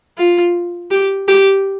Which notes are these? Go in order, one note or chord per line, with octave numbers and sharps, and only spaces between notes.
F4
G4
G4